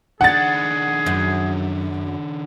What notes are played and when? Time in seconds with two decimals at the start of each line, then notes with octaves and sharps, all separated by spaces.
0.21 D#3 D4 G#4 F#5 A6
1.06 F#2